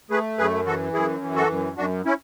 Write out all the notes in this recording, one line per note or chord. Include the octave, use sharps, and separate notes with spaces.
A3 G#4 B4
F#2 G#4 B4
E3 F#4 A4
F#2 E4 G#4
E3
F#4 A4
F#2
F#2 D4 F#4
C#4 E4